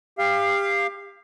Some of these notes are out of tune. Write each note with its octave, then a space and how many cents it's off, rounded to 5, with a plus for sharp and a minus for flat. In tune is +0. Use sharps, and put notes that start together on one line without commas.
G4 +25 F5 -10